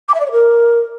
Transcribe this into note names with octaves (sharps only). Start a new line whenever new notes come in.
D6
E5
D5
C#5
A#4